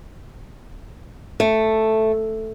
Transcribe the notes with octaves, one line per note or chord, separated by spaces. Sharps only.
A3